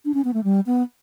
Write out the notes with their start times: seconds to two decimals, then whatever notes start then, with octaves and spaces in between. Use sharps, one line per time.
0.05 D4
0.14 C#4
0.24 B3
0.34 A3
0.44 G3
0.66 B3